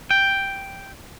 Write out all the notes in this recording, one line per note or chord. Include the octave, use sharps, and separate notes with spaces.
G5